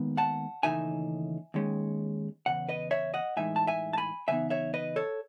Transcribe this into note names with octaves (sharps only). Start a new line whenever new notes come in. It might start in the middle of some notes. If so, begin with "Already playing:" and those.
Already playing: D#2 D#3 G#3 B3
F#5 A5
D#2 C#3 E3 A3 D#4 E5 G#5
D#2 D#3 G#3 C#4
E2 C#3 F#5
B4 D#5
C#5 E5
D#5 F#5
A2 E3 G#3 D#4 E5 G#5
A5
E5 G#5
A5
G#5 B5
C#3 E3 B3 D#4 E5 G#5
C#5 E5
B4 D#5
A4 C#5